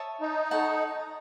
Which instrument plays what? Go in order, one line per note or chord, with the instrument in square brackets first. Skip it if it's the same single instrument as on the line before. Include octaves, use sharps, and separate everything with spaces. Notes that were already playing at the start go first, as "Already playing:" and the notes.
Already playing: [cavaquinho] C#5 E5 A5 D#6
[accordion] D#4
[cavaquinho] A4 C#5 F#5 A5